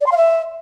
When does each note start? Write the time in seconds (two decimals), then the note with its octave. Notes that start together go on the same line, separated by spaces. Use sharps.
0.01 D5
0.06 C6
0.11 F5
0.17 E5